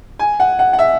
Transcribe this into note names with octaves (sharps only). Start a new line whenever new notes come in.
G#5
F#5
F#5
F#5
E5